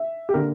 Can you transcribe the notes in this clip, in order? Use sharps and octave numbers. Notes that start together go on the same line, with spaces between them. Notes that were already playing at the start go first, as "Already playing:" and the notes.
Already playing: E5
G4
D3 A#3 A#4